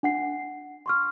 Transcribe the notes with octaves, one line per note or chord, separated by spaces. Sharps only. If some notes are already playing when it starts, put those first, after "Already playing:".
D4 F#5 C7
C6 C#6 F6